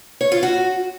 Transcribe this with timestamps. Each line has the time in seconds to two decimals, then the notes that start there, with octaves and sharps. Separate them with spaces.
0.21 C#5
0.32 F4
0.43 F#4